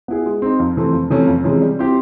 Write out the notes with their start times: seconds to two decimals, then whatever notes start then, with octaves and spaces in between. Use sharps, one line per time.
0.08 B3 E4 G#4
0.26 G#3
0.42 C4 D#4
0.60 F2
0.77 C3 E3 A3 C4
0.93 F2
1.10 C3 E3 A3 C#4
1.27 F2
1.44 C3 E3 G#3 C#4
1.62 G3
1.79 C4 E4 G4 C5